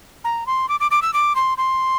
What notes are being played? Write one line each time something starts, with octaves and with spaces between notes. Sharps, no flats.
A#5
C6
D6
D6
D6
E6
D6
C6
C6